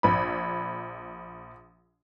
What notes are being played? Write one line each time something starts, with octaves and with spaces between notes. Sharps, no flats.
A#1 B5